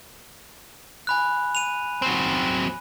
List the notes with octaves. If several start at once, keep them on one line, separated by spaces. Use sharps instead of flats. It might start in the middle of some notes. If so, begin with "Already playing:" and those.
G#5 B5 F#6
D#7 F7
F#3 C4